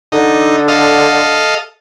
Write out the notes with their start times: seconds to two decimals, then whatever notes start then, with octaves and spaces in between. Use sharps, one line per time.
0.12 D3 D#4
0.68 A4 D#5 F5